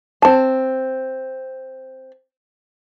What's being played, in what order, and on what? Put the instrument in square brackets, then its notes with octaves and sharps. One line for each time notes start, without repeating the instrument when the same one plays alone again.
[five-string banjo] C4 A5